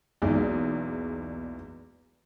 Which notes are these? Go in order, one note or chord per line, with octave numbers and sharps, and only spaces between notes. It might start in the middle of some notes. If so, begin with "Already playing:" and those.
B1 E2 G#3 A#3 D#4 D5